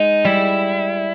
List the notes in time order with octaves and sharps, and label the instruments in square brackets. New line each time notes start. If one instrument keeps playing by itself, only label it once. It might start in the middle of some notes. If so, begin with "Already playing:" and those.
Already playing: [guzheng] G#3 [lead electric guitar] D#4
[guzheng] G3 [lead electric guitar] E4